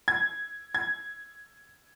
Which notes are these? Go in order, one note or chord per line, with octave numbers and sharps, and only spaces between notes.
G#6
G#6